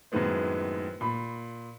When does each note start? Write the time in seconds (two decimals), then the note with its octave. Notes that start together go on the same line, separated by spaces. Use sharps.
0.12 F#2 A2 D#3 G#3 B3 C4
1.01 A#2 B5